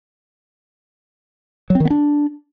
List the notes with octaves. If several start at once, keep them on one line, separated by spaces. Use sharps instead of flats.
F#3
C4
D#3
B3
D4